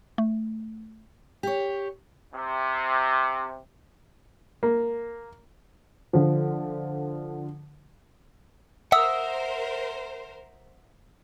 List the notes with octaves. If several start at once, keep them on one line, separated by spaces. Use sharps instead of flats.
A3
G4 C#5
C3
A#3
D3 F3
A#4 C5 E5 F#5 D#6 E6